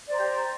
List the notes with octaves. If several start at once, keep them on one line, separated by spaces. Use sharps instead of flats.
G4 C5 D5 A#5